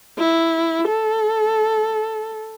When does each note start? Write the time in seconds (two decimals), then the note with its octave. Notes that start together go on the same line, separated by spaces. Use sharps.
0.18 E4
0.88 A4